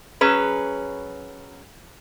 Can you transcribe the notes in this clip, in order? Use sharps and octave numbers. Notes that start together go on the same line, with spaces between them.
F#3 C#4 G#4 B4